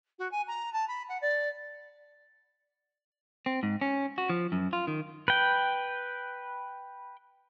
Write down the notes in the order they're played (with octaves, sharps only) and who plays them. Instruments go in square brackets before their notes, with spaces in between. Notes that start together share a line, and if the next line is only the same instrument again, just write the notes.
[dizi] F#4
G#5
A#5
A5
B5
F#5
D5
[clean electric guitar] C4
G#2
C#4
F#4
F3
F#2
F4
D#3
[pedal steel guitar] B4 G5